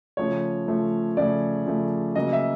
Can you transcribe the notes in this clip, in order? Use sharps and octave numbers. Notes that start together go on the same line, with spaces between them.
C#3 F3 A3 C#5
C#3 F3 A3
C#3 F3 A3 D5
C#3 F3 A3
C#3 F#3 A#3 D#5
E5